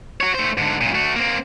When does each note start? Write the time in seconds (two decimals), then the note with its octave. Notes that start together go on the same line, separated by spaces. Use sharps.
0.21 F#4 C#5
0.34 A3 C5
0.57 G#2 D3
0.81 F#2 A#2
0.94 A3 F#4
1.16 A#3 C4